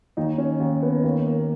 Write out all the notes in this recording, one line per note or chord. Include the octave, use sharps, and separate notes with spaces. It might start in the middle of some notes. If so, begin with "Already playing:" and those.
D#2 D#4
C#4
D#2
B3
D#2 A#3
A#3